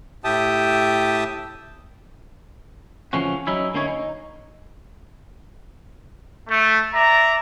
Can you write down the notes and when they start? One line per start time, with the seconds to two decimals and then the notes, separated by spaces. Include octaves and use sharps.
0.24 A2 G4 E5 G5 A5 D#6
3.13 C#3 E3 F3 A3 C#4 F#4
3.47 F#3 C#4 D#4 E4
3.74 D3 A#3 C#4 D#4 E4 C#5
3.88 D#4
6.48 A3
6.94 D5 E5 A#5